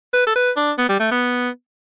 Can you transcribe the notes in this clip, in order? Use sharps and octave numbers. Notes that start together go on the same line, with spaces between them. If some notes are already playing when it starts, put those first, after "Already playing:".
B4
A4
B4
D4
B3
G3
A3
B3